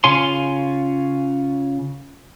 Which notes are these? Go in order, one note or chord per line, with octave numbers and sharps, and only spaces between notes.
C#3 F4 C#5 G#5 C6